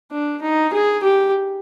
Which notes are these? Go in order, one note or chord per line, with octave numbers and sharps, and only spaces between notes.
D4
D#4
G#4
G4